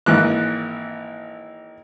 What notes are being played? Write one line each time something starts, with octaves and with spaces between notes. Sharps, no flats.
G#1 E3 A#3 F#6